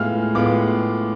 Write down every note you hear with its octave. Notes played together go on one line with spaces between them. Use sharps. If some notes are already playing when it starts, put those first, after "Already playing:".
Already playing: A2 G#3 B3 F4 F6
A2 G#3 B3 F4 D6